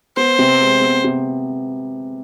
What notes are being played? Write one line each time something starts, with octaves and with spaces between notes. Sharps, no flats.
B3 C5
C3
G#3
B3
C3